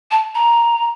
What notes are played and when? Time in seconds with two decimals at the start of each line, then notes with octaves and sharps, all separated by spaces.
0.11 A5
0.34 A#5